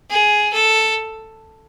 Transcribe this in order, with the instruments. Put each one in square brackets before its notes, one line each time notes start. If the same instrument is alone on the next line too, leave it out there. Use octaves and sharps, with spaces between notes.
[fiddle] G#4
A4